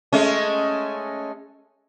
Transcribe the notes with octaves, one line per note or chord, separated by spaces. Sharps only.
G#3 A3 C#4